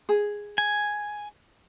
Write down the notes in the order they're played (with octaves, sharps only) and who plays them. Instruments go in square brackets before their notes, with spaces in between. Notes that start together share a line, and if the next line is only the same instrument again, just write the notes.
[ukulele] G#4
[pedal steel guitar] G#5